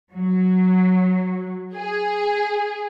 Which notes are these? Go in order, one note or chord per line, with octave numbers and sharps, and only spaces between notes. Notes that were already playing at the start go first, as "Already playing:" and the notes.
F#3
G#4